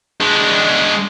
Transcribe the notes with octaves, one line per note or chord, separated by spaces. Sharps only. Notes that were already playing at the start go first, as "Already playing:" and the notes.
G#3 D4